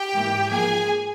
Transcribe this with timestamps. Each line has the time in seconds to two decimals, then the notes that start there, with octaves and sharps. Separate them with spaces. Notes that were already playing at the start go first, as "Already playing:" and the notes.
Already playing: G4 G5
0.13 G#2 E3 A#3
0.49 G#2 F3 A#3 G#4 G#5